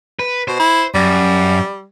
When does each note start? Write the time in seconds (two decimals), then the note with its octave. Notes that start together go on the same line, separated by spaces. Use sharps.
0.19 B4
0.48 B2 C5
0.59 E4
0.95 F#2 G3